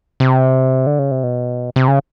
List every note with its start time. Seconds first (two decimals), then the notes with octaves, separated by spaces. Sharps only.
0.20 C3
0.87 D3
0.99 C#3
1.11 C3
1.23 B2
1.76 C3
1.88 C#3